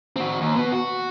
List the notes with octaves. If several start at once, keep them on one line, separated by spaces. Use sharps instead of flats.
C4 F#4
D#2
B2 B3
F#4